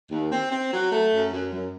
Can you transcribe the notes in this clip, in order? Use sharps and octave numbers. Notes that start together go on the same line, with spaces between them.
D#2
C4
C4
F#3
A3
F#2
F#2
F#2